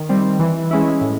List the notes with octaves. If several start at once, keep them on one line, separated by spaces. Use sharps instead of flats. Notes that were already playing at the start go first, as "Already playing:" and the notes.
Already playing: D#3
G3 C4
E3
G#3 C#4 E4
A2